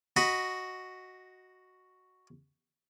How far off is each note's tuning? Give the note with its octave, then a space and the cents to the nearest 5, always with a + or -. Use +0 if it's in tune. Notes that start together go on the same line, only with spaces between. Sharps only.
F#4 +0 D#5 +0 B5 +0